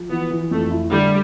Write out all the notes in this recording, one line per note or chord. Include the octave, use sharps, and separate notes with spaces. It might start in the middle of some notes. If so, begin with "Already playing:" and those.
Already playing: F3
E3 B3
E3
F2 A3
E4
D3 G3